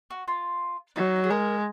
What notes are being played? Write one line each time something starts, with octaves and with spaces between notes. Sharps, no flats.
F#4
F4
F#3 D#4
G#4
G#3 A#4